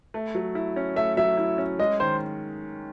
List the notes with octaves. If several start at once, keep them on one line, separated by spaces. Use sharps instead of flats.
A3
F#3
E4
C#4
A3 E5
F#3 E5
E4
C#4
G#3 D#5
D#3 C5